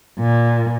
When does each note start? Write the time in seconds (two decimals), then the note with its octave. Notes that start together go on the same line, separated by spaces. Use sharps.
0.19 A#2